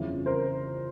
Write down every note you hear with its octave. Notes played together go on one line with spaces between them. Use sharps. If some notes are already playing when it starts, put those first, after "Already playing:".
Already playing: G1 F2 C#3 E3
A#4 C5